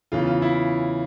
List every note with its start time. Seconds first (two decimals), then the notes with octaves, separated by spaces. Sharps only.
0.12 E2 C#3 E3 F4
0.27 F4
0.42 E4